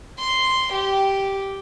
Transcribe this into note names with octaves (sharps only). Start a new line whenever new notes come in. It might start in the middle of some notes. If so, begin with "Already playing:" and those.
C6
G4